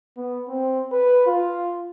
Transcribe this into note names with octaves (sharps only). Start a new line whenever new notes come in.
B3
C4
B4
F4